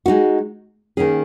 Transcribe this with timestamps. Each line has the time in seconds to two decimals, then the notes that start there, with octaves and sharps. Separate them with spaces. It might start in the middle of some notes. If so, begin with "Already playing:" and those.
0.06 G#3 D#4 F#4
0.97 D#3 A#3 C#4 G#4